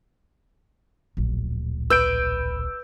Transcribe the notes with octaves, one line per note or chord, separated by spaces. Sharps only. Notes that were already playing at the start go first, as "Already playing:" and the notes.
D1 A#1
B4 E6 G6 D7